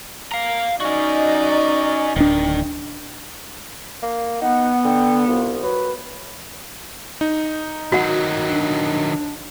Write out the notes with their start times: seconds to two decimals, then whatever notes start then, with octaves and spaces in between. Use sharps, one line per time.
0.32 F5 A#5
0.80 C#4 D#4 F#4 D5 D#5
2.16 D1 D#3 D4
4.02 A#3
4.41 B3 D#4 F#5
4.85 D3 G5
5.27 C2 F4
5.63 F#3 B4
7.21 D#4
7.92 D#3 F#3 F#4 F#5
8.49 D4